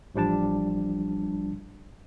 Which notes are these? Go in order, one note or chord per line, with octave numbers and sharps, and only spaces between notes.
A1 F3 G3 D4 A5